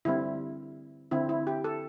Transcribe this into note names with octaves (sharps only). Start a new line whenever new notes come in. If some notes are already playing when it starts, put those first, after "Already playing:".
D3 G3 C4 E4
D3 C4 E4
E4
G4
A4